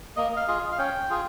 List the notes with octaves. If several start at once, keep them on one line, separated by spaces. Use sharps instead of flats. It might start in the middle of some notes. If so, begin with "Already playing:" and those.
A#3 D#5
F5
F4 G#4 D#5
F5
C#4 G5
F4 G#4